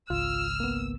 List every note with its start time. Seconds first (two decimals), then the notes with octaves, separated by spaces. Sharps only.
0.10 G#1 C#2 F4 E6 F6
0.60 A#3 B3